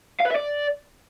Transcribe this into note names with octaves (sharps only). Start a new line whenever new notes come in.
F5
B4
E5
D5